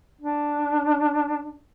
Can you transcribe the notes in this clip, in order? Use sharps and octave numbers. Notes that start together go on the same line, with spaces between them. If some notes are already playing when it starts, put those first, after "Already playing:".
D4